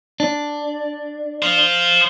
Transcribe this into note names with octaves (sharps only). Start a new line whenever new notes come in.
D4
C5 F5